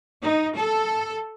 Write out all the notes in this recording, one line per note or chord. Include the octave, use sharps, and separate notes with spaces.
D#4
A4